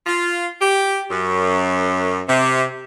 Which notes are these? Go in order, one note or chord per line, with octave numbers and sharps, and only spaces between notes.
F4
G4
F#2
C3